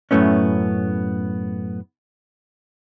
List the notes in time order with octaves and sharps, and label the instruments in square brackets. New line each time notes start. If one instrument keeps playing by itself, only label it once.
[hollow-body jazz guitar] F#2 A2 A3 B3 C#4